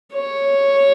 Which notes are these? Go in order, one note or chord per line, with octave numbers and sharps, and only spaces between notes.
C#5